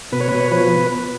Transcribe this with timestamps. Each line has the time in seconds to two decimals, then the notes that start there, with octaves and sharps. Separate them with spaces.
0.12 B2 B4
0.21 C#5
0.29 B2 B4
0.40 C#5
0.51 F3 B4